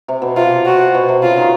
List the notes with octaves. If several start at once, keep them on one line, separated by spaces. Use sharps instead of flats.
C3
B2
C3 F4
F#4
B2
C3
C#3 F4
D#3